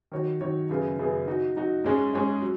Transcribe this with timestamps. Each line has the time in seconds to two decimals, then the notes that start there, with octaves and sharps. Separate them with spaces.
0.12 D#3 F#3 D#4 F#4 C#5
0.41 D#3 F#3 D#4 F#4 C#5
0.69 F#2 C#3 B3 G#4
0.99 F#2 C#3 B3 G#4
1.27 F#3 D#4 F#4
1.56 F#3 D#4 F#4
1.84 G#2 G#3 C#4 G#4
2.13 G#2 G#3 C#4 G#4
2.42 F#3